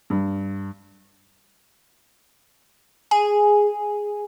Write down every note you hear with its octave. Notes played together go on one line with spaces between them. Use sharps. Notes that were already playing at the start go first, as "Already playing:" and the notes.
G2
G#4